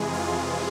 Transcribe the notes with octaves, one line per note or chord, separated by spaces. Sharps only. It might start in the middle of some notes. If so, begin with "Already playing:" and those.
Already playing: F2 C3 E3 G#3 G#4
F4